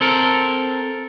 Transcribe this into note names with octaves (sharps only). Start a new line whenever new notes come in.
C4 A4 A#4